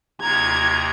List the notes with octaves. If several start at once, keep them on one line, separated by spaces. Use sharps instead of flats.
D#2 C3 A#5 G#6